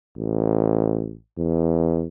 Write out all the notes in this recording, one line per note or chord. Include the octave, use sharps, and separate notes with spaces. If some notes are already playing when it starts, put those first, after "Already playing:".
A1
E2